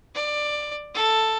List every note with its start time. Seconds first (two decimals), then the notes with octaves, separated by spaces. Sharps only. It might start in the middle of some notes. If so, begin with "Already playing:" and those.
0.15 D5
0.94 A4